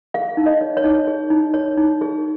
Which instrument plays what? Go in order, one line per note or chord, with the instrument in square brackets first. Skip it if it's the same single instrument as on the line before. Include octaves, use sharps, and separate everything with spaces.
[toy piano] G#4 F5
D#4
D#5
C#5
C#5
D#4
G#4
D#4
C#5
D#4
G#4